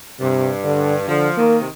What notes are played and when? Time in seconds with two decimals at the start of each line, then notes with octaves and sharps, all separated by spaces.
0.21 G2 C3
0.64 D3
1.08 D3 F3
1.38 D#3 A#3
1.60 C3